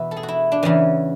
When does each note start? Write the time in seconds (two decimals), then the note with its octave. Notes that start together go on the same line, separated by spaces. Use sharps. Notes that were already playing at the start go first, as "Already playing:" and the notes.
Already playing: E2 B2 B4 E5
0.11 A4
0.17 G#4
0.23 F#4
0.28 E4
0.52 D4
0.63 E2 C#3 E3 C#4